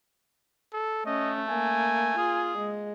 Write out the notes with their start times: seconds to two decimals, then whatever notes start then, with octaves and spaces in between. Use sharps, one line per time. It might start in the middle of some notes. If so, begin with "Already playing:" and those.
0.73 A4
1.06 A3 C#4 D#5
1.49 A#3 G#5
2.17 F4 G#4
2.58 G#3